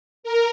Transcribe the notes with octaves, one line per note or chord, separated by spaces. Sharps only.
A#4